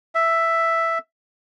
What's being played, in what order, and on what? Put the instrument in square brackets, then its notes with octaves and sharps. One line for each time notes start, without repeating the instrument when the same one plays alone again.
[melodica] E5